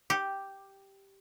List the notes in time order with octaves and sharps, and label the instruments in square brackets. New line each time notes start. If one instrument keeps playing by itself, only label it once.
[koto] G4